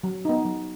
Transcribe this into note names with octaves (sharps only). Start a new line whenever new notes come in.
F#3
B3 D#4
F#3